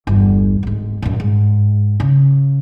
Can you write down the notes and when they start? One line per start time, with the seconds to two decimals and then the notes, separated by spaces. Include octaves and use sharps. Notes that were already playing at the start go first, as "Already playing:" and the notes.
0.07 G1 E2
0.63 D1 G#2
1.02 F#2 A#2
1.20 G#2
2.00 C#3